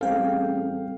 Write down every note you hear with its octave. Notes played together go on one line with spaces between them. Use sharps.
A1 G3 C4 G#4 A4 F5 G5